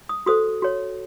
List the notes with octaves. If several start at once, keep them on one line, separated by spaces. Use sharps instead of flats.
D#6
F#4 A4 C5 D#6
F#4 C#5